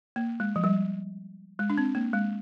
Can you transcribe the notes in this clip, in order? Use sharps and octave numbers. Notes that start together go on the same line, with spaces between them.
A#3
G#3
F3
G3
G#3
D4
C4
A#3
G#3